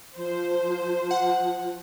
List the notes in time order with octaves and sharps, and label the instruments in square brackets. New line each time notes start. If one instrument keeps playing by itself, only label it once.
[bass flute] F3 [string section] C5
[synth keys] F#5